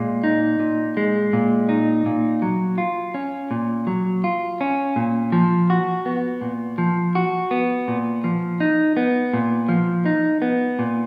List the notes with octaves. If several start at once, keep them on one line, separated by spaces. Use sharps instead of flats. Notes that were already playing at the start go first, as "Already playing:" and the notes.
Already playing: A#2 G#3
D#4
A#2
G#3
A#2
D#4
A#2
F#3
F4
C#4
A#2
F#3
F4
C#4
A#2
F3
F#4
B3
A#2
F3
F#4
B3
A#2
F3
D#4
B3
A#2
F3
D#4
B3
A#2